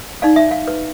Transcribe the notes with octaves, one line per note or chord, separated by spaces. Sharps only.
D#4 D5 F5
E5
F5
B4